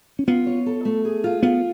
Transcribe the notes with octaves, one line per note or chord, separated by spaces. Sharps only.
C#4
B3 F4
C#5
A4
A3
G#4
F4
B3 F4